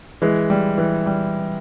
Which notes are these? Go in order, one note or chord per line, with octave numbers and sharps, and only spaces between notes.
E3 G#3
G3
E3
G3